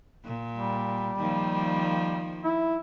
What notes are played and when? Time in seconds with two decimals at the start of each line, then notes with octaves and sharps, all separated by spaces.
0.24 A#2
0.56 G3
1.19 D#3 F3 A#3
2.44 E4